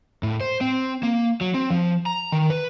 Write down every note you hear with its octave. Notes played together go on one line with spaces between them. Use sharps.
A2
C5
C4
A#3
F#3
C4
F3
A#5
D#3
B4